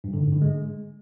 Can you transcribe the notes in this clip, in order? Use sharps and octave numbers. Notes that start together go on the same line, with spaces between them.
G2
D3
G#2
D3
G#3